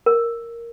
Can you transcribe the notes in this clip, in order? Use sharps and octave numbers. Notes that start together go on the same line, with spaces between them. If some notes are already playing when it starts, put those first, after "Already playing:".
A#4